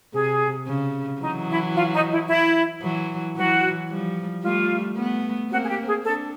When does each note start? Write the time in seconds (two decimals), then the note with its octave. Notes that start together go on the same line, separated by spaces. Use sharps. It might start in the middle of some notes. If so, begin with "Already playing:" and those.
0.14 C3 G#4
0.67 C#3
1.21 E3 F#3 D#4
1.48 E4
1.75 F4
1.93 D#4
2.11 E4
2.28 E4
2.82 E3 F#3
3.36 E3 F#3 F#4
3.89 F3 G3
4.43 G3 A3 F4
4.96 A3 B3
5.50 A#3 C4 F#4
5.63 G#4
5.68 G4
5.86 G#4
6.04 C4 D4 A4